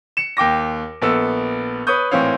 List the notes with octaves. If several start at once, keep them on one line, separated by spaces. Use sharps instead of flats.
C#7 E7
D#2 G5 D6 A#6
A#1 B3 A4 E6
B4 C#5 C#6 D#6 G6
G#1 A2 E3 C4 C#5 F5